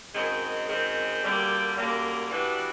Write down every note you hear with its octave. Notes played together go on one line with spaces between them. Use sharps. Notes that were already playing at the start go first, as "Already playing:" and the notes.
F#2 D#3 G#3 C4
F#2 D#3 G#3 C4
F#2 D3 G3 A#3
F#2 D3 G3 A#3
E3 G3 B3 D4 F#4